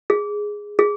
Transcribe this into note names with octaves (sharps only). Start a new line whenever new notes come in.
G#4
G#4